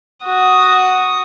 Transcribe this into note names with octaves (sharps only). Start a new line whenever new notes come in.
F#4 D#6